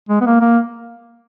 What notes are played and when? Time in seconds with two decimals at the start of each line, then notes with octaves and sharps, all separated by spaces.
0.10 G#3
0.21 B3
0.26 A#3
0.42 A#3